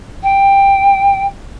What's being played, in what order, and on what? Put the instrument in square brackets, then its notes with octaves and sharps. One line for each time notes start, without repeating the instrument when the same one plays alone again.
[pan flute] G5